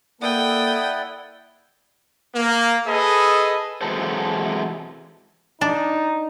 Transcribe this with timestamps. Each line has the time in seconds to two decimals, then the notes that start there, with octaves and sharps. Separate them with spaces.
0.22 A#3 E4 A4 D5 F#5 G5 D#6
2.35 A#3
2.87 G#4 A4 B4 D#5
3.81 C3 E3 F#3 G#3 A4 C5
5.61 D4 D#4